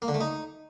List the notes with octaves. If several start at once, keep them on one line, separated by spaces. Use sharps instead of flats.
A#3
D3
A3
D#4